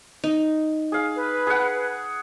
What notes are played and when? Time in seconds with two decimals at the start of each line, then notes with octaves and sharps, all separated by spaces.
0.24 D#4
0.92 G#4 F5
1.17 B4
1.47 G#4 F#5